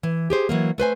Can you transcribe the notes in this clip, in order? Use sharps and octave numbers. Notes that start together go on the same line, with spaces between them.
E3
G4 G#4 C5
E3 F#3 A#3
A3 B4 C5 G#5